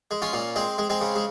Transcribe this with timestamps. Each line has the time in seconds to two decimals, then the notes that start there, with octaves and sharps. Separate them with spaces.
0.11 G#3
0.22 C#4 F4
0.33 A#2
0.56 G#3 C4
0.78 G#3
0.90 G#3 C4
1.01 C#3
1.15 G#3